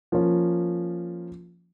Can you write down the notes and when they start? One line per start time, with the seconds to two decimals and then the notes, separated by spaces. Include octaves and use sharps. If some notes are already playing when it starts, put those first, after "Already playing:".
0.12 F3 A#3 C#4 F4